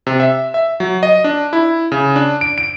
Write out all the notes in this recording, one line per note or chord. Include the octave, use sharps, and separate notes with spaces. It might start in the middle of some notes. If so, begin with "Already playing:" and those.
C3
E5
E5
F#3
D#5
D4
E4
C#3
D4
D7
D7